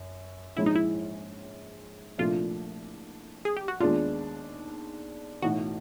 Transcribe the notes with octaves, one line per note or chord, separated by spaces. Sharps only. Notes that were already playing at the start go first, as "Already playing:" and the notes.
Already playing: F#2
A#1 G#2 F3 G#3 C#4 E4
D#4
E4
C2 A#2 F3 A3 D4 F4
G#4
G4
F#4
D#2 D#3 G#3 B3 D4 F4
B1 A2 E3 F#4